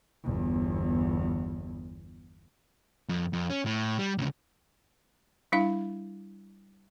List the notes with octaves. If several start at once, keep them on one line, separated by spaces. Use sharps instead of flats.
G1 E2
F2
F2
C#4
A2
G3
D2 C#3
G3 D4 E4 F5